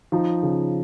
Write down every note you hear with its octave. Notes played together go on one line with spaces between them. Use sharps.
F3 D#4
C#3